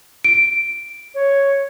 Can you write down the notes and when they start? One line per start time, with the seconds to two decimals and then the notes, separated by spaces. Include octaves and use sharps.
0.24 D7
1.15 C#5